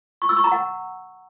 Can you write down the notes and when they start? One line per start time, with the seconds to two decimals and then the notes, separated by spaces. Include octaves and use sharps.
0.22 C#6
0.29 E6
0.37 C#6
0.44 A#5
0.52 F#5